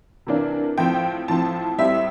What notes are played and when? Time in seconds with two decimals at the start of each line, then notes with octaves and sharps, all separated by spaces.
0.27 C3 E3 A#3 D4
0.77 A2 F3 C4 G5
1.28 A2 F3 C4 A5
1.78 A2 G3 C4 E5